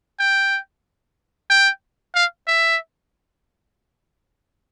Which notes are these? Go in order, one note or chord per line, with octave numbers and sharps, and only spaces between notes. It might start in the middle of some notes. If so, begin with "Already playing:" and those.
G5
G5
F5
E5